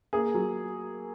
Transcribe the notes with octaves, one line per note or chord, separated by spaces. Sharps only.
A#3 G#4
F#3